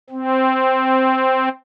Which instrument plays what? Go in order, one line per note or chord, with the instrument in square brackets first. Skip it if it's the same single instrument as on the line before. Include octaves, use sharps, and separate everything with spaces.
[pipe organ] C4